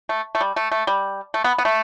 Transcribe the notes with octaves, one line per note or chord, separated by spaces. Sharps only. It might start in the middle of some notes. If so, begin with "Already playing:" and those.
A3
A3
G3
A3
A3
G3
A3
B3
B3
A3